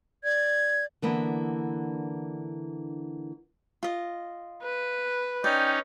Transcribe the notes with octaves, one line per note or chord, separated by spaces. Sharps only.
D5 G#6
D3 E3 A#3 B3 D4
F4 D#5
B4
C#4 D#4 D5 G5